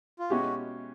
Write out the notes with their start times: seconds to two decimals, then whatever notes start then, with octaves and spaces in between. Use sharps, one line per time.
0.19 F4
0.30 B2 G#3 C#4 E4 F#4 G4